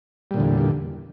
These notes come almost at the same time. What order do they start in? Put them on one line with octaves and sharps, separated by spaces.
G3 A#2 D3 E2